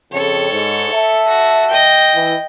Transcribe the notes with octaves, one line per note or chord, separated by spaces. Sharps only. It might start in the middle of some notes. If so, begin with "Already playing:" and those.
F2 C#3 A4 C#5
G#2
E5 A5
F#4
D#5 G5
E3